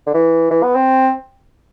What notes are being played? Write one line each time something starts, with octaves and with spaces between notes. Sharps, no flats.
D3
E3
E3
B3
C4